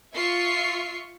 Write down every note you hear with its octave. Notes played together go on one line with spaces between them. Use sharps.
F4 E5 C#6 C7